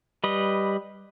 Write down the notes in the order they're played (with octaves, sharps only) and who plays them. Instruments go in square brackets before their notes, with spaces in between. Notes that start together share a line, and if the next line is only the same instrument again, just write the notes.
[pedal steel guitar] G3 B4 D#5